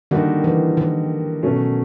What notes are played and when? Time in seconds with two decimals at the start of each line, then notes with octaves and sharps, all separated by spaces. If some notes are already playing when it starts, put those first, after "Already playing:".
0.11 D3 D#3 G3 A#3 D#4 F#4
0.44 E3
0.77 D#3
1.43 B2 F#3 A3 C#4